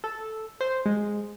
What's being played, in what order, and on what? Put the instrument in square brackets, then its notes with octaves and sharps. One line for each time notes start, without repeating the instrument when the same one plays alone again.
[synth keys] A4
C5
G#3